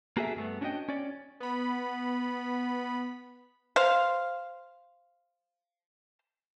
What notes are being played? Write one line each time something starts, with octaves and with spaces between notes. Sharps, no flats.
A#3 F#4 G#4 A4 E5
G2 A3 B3
C#4 D4 F#4 C#5 D#5 G5
C#4 D5
B3 B5
C5 F5